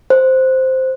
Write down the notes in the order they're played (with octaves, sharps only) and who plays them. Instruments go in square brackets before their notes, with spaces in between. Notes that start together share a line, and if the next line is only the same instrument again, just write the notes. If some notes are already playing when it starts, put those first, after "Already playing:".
[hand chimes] C5